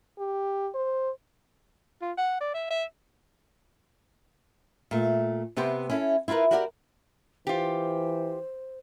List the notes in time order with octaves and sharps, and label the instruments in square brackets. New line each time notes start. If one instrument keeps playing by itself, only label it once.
[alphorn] G4
C5
[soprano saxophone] F4
F#5
D5
E5
E5
[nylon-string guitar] A#2 A3
C3 B3 G4 B4 C5
C#4 E4 A4
E4 F4 G4 A#4 B4
F#4 G4 A#4 D5 F5 F#5
[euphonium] E3 [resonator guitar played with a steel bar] F4 G4 [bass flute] C5